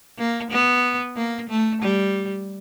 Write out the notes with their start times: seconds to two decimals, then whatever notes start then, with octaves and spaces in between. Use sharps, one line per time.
0.18 A#3
0.51 B3
1.16 A#3
1.50 A3
1.82 G3